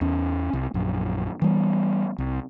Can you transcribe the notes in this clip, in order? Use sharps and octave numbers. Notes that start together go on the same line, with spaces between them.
E2 C#4
C2
A#1 F#2
E3 G3 B3
C2